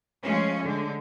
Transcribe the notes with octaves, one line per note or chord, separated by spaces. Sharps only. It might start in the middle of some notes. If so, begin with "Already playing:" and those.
F3 G#3 A3 C#4
D3 G#3